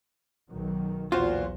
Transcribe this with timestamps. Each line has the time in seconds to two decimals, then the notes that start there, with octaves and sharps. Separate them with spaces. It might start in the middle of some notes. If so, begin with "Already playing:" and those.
0.49 B1 D#3 F#3
1.12 B1 E2 A#2 F4 F#4 C5